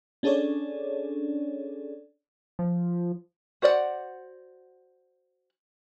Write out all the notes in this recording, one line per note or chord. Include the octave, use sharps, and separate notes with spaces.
C#4 D4 G#4 A4 C#5 D5
F3
F#4 C5 D5 D#5 F#5